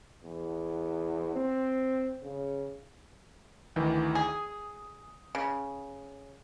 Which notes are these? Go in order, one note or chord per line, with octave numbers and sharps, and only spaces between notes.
E2
C4
C#3
D2 D#3 E3
G#4 D#6
C#3